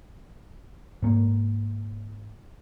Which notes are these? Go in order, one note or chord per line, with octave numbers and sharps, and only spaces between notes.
G#2 A#3